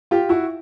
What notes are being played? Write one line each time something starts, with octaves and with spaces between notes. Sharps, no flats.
F4 G4
E4 F#4